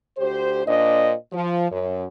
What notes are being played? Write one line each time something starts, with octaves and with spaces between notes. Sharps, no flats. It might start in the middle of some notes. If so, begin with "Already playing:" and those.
D2 G4 C5
A#2 D4 C5 D#5
F3
F#2